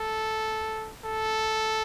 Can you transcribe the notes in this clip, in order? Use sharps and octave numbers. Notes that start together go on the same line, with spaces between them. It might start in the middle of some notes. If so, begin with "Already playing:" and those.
Already playing: A4
A4